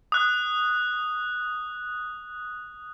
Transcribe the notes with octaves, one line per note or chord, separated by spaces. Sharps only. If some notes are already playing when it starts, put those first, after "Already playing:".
D#6 F#6